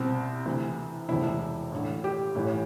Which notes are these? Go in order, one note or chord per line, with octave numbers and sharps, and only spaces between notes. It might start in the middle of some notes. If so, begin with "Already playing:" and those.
Already playing: C2 B2 C4
D2 C3 E3
E1 D2 C3 E3 E4
A1 G2 D3
G4
A1 A2 E3